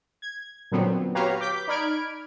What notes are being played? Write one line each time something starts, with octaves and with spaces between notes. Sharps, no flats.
G#6
A#2 D3 F#3 B3 C4
F#4 G4 B4 C#5 F5 A#5
D6 G6 B6
D#4 D5 B5 F6 G#6 D7